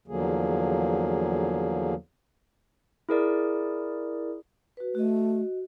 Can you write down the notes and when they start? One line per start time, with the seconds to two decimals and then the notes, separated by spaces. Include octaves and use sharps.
0.08 E2 D3 F3 F#3 A#3 G#4
3.09 E4 G#4 A#4 D5
4.77 F#4 B4
4.95 A3 F#4 D#5